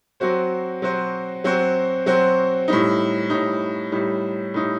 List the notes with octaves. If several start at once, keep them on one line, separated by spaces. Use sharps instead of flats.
F#3 C4 F#4 C5
F#3 C4 F#4 C5
F#3 C4 F#4 C5
F#3 C4 F#4 C5
A2 G3 D#4
A2 G3 D#4
A2 G3 D#4
A2 G3 D#4